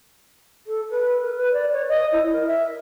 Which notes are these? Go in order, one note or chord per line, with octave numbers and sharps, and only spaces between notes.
A4
B4
A#4
B4
D5
C#5
D#5
E4
A#4
E5